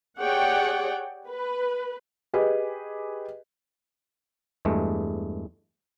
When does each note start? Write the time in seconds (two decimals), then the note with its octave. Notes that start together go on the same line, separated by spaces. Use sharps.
0.18 G4 G#4 C#5 D5 F#5 G5
1.28 B4
2.34 G4 G#4 B4 D#5
4.65 E2 G2 G#3 A3